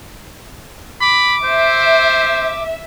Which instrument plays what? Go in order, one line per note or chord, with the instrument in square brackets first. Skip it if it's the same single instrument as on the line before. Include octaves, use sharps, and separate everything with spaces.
[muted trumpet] B5 [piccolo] D6
[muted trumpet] C5 [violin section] E5